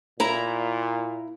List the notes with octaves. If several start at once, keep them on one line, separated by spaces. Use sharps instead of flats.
A#2 E4 A#5